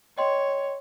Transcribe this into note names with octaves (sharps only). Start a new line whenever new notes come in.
C#5 D#5 G5 C6